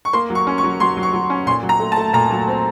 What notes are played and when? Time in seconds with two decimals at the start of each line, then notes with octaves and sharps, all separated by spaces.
0.05 C#6
0.13 A#3 C6
0.30 F#3
0.35 C#6
0.47 C#4
0.58 C#6
0.64 F#3
0.80 F#3 C6
0.97 F#3
1.03 C#6
1.14 F#3
1.30 C#4
1.46 A#2 C6
1.63 F#3
1.69 A#5
1.80 A3
1.92 A5
1.97 A3
2.13 A#2 A#5
2.31 F#3
2.47 C4